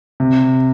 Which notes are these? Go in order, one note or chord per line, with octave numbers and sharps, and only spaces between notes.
C3